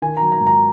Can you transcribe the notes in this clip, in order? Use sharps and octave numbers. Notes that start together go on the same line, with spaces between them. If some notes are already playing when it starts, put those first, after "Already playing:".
D#3 G#5
A#5
F#3
A#5
G#2
A#5